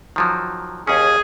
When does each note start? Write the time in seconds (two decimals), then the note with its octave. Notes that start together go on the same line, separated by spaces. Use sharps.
0.16 D#3 F3 F#3
0.87 D#2 C#4 G#4